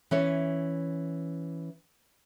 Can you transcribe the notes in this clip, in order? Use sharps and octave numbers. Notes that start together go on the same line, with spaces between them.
E3 C#4 C#5